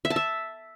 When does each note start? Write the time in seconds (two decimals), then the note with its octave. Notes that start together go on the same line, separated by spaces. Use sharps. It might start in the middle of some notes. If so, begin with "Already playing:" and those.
0.05 E5
0.10 A5
0.16 E5